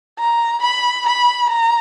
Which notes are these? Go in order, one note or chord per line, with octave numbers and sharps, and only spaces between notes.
A#5
B5
B5
A#5